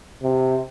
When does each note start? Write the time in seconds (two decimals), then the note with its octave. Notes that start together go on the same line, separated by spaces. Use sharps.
0.22 C3